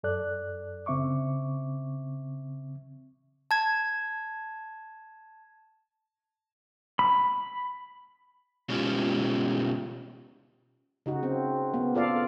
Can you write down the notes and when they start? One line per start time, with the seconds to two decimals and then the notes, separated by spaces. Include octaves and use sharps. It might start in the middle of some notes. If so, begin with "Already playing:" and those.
0.03 F#2 A4 D5 F#6
0.86 C#3 C4 E5 C#6 D6
3.51 A5 G#6
6.99 B5
8.69 B2 F#3 G#3 C#4 F4 G4
11.06 C#3 D#4 F#4
11.23 C4
11.74 A#3 B3
11.95 F4 A4 D5 F5